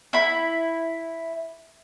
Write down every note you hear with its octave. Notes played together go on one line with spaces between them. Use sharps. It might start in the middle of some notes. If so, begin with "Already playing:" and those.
E4 B5